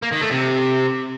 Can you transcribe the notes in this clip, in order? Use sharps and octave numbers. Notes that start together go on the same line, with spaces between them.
A#3
D#3
A3
C3